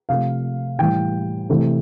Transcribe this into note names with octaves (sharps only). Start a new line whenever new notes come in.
C3 F3 A3 F5
A2 E3 G3 G5
C3 E3 A3